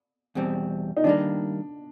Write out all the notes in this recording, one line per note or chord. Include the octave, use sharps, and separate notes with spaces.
E2 B2 G3 C4
D#4
D#3 G3 A#3 D4